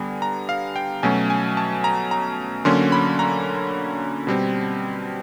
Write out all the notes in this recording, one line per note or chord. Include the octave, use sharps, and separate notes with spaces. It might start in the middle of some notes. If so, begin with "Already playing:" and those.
Already playing: D3 G3 B3 G#5
A#5
F5
G5
B2 F#3 A3 C#4 G#5
G#5
A5
A#5
A#5
D3 F#3 A#3 C#4 C6
B5
A#5
B2 G3 C4